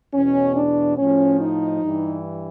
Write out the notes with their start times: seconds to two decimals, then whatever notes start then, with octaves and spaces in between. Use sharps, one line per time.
0.14 E2 B2 C#4
0.56 D4
0.98 A2 F3 C#4
1.41 D#4
1.82 G2 E3